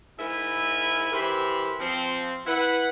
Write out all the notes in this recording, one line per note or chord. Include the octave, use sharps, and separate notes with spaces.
G#2 E4 A#4 E5 G#5 B5
E3 G4 A#4 C5 E5 B5
F3 C4
E4 B4 F#5